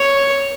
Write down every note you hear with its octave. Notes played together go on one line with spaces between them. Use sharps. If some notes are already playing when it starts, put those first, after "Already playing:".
Already playing: C#5